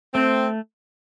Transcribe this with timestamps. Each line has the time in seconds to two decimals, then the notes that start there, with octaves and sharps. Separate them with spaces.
0.14 A3 C4